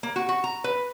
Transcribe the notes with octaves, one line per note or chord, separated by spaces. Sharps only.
A#3
F#4
F#4
A#5
B4